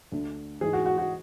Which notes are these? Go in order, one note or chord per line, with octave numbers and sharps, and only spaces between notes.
D2 D3
G#2 E3 G#4
F#4
F#4
F#4